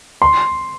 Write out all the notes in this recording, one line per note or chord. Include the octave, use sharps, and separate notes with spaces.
C6